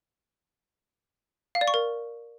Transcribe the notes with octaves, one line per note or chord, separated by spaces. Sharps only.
F5
D5
C#6
A#4